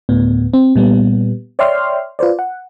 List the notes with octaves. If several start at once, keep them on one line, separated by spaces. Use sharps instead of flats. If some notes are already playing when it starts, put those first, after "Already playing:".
D2 A2 B3
C4
A#2 G3 B3
C#5 D5 E5 G5 C6 F6
F4 B4 C5 D5
F#5